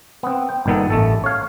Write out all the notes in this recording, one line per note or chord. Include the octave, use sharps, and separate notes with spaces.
B3 C4
G5
G1 A#2 D#3 B3 A4
A1 A3 A4
C#5 F5